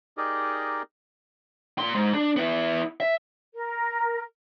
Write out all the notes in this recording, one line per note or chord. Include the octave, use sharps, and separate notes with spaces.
D#4 G4 G#4 A#4 D5 D#5
A#2 C6
G#2
D4
B3 E4
E5
A#4